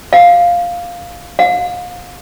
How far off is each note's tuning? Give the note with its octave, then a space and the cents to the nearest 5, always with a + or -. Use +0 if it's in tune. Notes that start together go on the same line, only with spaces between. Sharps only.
F5 +5
F5 +35